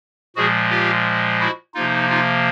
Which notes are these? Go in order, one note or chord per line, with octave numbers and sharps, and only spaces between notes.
A#2 F3 G#3 F#4 G#4
F4 G4
E4 F#4
C3 F3 A#3 D#4 F4
D#4 F4